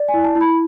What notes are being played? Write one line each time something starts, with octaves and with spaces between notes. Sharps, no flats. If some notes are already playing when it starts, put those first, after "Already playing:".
Already playing: D5
G#5
E4
A5
E4
B5